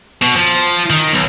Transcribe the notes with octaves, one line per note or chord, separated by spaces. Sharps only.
B2
F3
D#3
B1